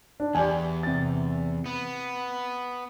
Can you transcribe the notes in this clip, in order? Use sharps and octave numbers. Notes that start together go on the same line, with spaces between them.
D4
E2 G4 D5 G#5
C3 A6
B3